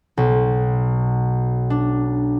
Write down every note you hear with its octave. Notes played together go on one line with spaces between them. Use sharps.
B1
D4